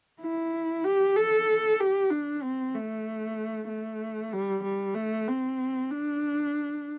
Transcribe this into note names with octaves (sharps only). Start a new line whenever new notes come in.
E4
G4
A4
G4
D4
C4
A3
A3
G3
G3
A3
C4
D4